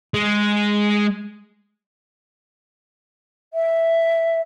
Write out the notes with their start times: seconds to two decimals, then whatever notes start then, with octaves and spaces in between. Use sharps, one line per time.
0.14 G#3
3.53 E5